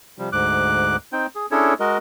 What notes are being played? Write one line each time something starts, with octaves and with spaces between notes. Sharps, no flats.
C3 F3 G3
D2 G#2 D6 F#6
C4 D#4 G5
G#4
C#4 D4 E4 G#4 A4 C#5
G#3 F#4 A#4 D#5